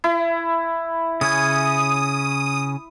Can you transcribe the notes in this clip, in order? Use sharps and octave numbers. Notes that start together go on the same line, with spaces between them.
E4
C#3 C#4 G#5 D#6